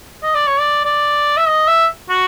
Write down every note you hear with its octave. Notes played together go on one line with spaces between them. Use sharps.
D#5
D5
C#5
D5
D5
E5
D#5
E5
F#4